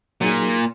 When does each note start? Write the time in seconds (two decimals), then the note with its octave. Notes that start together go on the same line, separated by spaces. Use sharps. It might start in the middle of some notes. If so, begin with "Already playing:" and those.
0.21 A#2 F#3 A#3 D#4 G#4